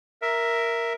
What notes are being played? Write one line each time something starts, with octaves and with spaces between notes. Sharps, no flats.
A#4 E5